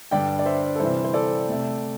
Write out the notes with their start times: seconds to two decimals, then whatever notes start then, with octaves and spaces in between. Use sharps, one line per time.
0.11 G2 D3 G3 D5 G5
0.39 D5
0.46 C5 E5
0.75 A4
0.80 C3 E3 G3 C5
1.04 C5
1.14 A4 D5
1.48 C3 A3